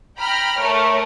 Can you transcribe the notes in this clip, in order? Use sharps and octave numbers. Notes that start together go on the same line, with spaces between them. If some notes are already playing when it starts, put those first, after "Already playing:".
G5 A#5 B5 F6
A3 A#4 C#5